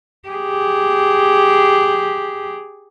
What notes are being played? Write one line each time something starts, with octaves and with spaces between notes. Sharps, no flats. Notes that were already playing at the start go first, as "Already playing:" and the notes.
G4 G#4